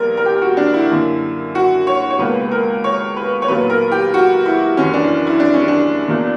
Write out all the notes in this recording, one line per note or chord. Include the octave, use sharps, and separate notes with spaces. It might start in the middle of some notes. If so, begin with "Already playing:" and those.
Already playing: A#1 A#2 G3 B3 A#4
A#4
G4
F#4
D4
E4
F#2 D3 A#3
F#4
C#5
C#5
C#2 B2 A#3 B4
B4
A#4
C#5
B4
C#5
B1 A#2 F#3 B3 B4
A#4
G4
F#4
E4
F#1 F#2 E3 C#4
D4
E4
D4
C#4
D4
F#1 E2 B2 F#3 A#3